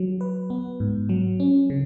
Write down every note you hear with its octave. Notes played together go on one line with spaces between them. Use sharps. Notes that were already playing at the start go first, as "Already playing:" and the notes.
Already playing: F#3
B4
B3
G#2
F#3
C#4
C#3